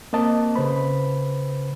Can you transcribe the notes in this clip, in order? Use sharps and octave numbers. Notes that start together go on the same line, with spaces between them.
A#3 C4 D#5 A5
C#3 B4 C5 B5